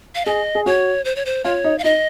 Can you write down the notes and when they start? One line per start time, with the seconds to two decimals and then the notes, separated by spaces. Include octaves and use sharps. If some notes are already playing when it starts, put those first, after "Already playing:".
0.15 F5
0.25 G#4 D#5
0.55 G#4
0.66 F#4 C#5
1.05 C5
1.16 C#5
1.25 C5
1.44 F4 C#5
1.64 D#4
1.79 F5
1.84 D#4 D#5